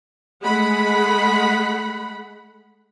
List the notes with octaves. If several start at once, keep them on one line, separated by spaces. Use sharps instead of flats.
G#3 A3 F#5 B5